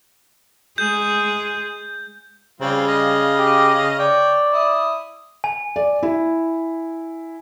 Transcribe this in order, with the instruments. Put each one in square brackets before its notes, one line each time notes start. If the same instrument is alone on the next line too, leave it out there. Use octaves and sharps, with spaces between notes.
[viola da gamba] G#3 G#4 [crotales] G6
[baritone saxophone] C#3 [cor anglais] G3 [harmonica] C4 F4
[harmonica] D#5 F5
[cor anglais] G4
[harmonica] C#5 G5 [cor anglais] D5
[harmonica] E4 D#6
[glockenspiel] G#5
[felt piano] D5
E4